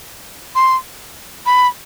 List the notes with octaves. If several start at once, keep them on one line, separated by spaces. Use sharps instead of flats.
C6
B5